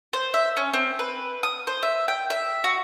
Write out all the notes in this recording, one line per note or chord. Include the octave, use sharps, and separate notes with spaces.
C5
E5
C#4
C4
B4
D#6
C5
E5
G5
E5
F#4